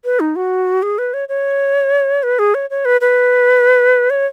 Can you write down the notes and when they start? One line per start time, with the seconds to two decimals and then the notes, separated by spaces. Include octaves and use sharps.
0.05 B4
0.20 D#4
0.36 F#4
0.83 G#4
0.98 B4
1.14 C#5
1.29 C#5
2.23 B4
2.39 G#4
2.54 C#5
2.70 C#5
2.85 B4
3.01 B4
4.10 C#5